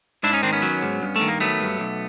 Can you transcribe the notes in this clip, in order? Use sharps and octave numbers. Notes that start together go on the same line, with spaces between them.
G#2 D4 E4
C#4 D#4
D#3 C4 D4
B3 C#4
F#3
G#2
G2
A3
D#3
A#3
F#3 A3 B3
G2
B1